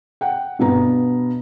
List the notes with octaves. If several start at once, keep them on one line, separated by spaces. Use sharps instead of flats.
F#5 G5
G2 B2 B3 A#5